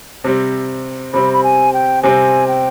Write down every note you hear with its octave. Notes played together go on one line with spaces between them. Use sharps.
C3 G3 C4
C3 G3 C4 B5
B5
G#5
G5
C3 G3 C4 G#5
G5